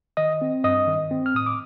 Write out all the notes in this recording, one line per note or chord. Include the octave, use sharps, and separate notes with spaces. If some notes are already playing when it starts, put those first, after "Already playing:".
D#3 D#5 D#6
C4
G2 D#5 D#6
D#3
C4
F6
A2 D#6
D6